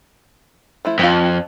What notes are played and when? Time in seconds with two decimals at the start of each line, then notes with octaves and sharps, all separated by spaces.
0.85 F3 A3 E4
0.99 F2 C4 F4